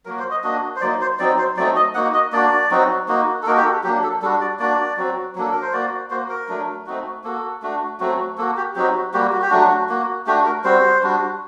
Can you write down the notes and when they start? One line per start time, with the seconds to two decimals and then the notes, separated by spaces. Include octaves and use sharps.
0.05 F#3 A#3 F#4 A#4
0.19 C5
0.31 D#5
0.43 A#3 D4 F#4 D#5
0.76 C5
0.81 F#3 A#3 D#4 D5
1.01 C5
1.19 F#3 C4 D#4 D5
1.38 C5
1.57 F#3 A3 C4 D#4 D5
1.76 D#5
1.95 A#3 D#4 F#4 F#5
2.14 D#5
2.33 A#3 D4 F#4 D5
2.71 F#3 C4 D#4 F#4
3.08 A#3 D#4 F#4
3.43 A4
3.46 A#3 D#4 F#4 A#4
3.57 G4
3.65 A4
3.84 F#3 G4
3.87 A#3 D4
4.03 A4
4.22 G3 D4 F#4 A4
4.41 D5
4.59 A#3 D4 F#4 D5
4.97 F#3 C4 F#4
5.35 F#3 A#3 D4 A4
5.51 A#4
5.62 C5
5.73 A#3 F#4 D5
6.11 A#3 F#4 C5
6.29 A#4
6.49 F#3 A3 D4
6.86 A3 C4 D#4 F#4
7.24 A#3 F#4 A4
7.62 A3 D4 F#4
8.00 F#3 A3 C4 F#4
8.38 A#3 A4
8.41 F#4
8.57 G4
8.76 F#3 C4 D#4 F#4 G4
9.13 G3 A#3 F#4 G4
9.32 F#4
9.42 G4
9.50 F#3 A3 D4 F#4
9.89 A#3 F#4
10.27 A3 D4 F#4 G4
10.46 A#4
10.64 G3 C4 F#4 C5
11.03 G3 D4 F#4